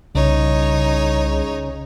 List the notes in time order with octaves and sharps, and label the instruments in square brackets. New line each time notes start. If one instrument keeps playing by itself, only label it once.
[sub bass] C2 [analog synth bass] C#3 [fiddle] D#4 C#5